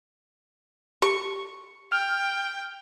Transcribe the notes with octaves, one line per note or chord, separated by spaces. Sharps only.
G4 C#6
G5 F6